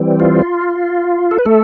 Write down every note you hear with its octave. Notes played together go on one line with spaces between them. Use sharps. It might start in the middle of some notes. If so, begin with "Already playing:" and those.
Already playing: E3 G3 C4
F4
A4
B4
A3 A4